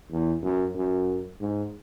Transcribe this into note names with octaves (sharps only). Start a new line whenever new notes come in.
E2
F#2
F#2
G#2